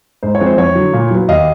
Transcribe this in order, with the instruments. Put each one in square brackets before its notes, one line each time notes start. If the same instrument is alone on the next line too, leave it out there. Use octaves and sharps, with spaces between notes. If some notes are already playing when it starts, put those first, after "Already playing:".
[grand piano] G#2 C5
C#5
F3 G#3 C4
C5
F2 C#5
D3 F#3
A#2
F#3 B3
D#2 D#5 F5